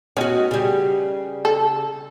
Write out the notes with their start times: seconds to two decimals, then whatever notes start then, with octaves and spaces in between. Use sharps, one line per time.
0.17 B3 C#4 F#4 D#5
0.51 C#3 G3
1.45 A4